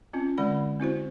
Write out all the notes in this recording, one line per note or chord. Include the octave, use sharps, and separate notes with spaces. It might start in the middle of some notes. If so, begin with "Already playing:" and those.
C4 C#4 F4
D3 G#3 D5 F#5 B5
C4 E4 F#4 C5